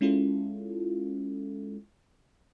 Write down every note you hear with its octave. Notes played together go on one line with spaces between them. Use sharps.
G#3 C#4 E4 F4 A4